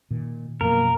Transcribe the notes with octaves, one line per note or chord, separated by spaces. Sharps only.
A#2 D#3
F#2 B2 F3 A#3 A#4